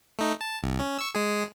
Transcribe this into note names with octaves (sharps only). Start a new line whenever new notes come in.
A3 D#4
A5
C2
C#4
C#6 E6
G#3 G#4